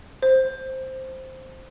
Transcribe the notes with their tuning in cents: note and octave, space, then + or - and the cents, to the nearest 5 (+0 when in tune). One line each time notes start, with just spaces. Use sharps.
C5 +0